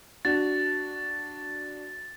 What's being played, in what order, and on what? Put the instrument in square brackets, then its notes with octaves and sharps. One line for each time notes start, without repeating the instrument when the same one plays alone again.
[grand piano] D4 F#4 [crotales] A6